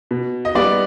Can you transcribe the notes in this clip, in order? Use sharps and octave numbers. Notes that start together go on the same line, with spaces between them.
B2
D#5
G3 B3 D5